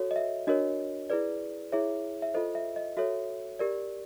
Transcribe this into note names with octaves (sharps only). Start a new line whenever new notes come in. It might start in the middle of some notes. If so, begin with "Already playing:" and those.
Already playing: F#4 A4 C#5
D#5
E5
D4 F#4 A#4 C#5 D#5
E4 G#4 B4 D5
E4 G#4 C#5 E5
E5
F4 A4 C5 D#5
E5
D#5
F#4 A4 C#5 E5
G4 A#4 D5